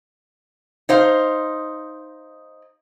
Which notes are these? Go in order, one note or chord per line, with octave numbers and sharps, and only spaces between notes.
D#4 C5 F5